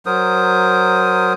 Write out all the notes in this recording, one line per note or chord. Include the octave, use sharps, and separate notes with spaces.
F#3 A#4 C5 D#6